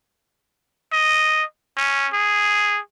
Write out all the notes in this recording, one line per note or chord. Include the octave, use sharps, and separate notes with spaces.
D#5
C#4
G#4